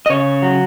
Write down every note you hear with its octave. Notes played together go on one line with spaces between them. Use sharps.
D#5
C#3 C#5
F#3